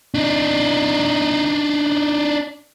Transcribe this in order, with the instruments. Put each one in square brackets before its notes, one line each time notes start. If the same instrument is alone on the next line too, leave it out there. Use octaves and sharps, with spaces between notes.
[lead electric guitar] D4 D#4